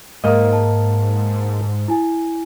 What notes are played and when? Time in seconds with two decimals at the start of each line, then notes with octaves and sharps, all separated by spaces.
0.24 G#2 A#3 D#5
0.53 A5
1.88 E4 G#5